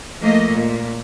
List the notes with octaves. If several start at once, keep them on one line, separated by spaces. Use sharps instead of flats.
F3 A3 A#3 D#5
A#2